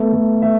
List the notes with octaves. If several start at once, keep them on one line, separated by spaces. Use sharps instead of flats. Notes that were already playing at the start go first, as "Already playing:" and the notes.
Already playing: A3 B3
A3
A3 E5